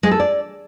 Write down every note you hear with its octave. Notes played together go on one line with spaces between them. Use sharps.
G#3
A4
D5